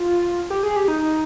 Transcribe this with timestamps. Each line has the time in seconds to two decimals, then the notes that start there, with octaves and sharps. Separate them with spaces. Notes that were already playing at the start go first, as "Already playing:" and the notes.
Already playing: F4
0.50 G4
0.63 G#4
0.76 G4
0.88 D#4